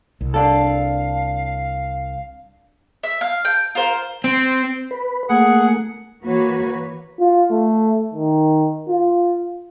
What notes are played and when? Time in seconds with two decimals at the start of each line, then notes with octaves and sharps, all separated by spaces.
0.21 C2
0.34 D4 A4 F5
3.03 E5
3.21 F5
3.45 G5
3.75 F4 A#4 C5
4.24 C4
4.91 B4
5.29 A3 A#3 G#4 F#5
6.22 E3 A#3 F#4 B4 C#5
7.20 F4
7.51 A3
8.14 D#3
8.88 F4